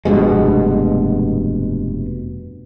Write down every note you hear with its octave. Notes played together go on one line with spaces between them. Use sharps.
F1 G2 B2 G#3